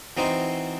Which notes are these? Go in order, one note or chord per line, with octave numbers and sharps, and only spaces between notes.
E3 C4 D#4 F#4 C5